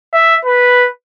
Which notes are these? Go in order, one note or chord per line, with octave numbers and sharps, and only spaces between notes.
E5
B4